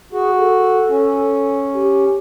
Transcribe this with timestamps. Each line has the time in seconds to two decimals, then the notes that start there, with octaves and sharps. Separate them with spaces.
0.13 F#4 G#4
0.39 A4
0.89 C#4
1.74 G4